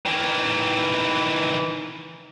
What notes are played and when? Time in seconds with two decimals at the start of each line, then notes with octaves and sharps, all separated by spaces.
0.06 D#3 E3